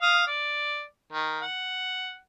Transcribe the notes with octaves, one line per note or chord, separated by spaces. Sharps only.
F5 D#6 F6
D5
D#3
F#5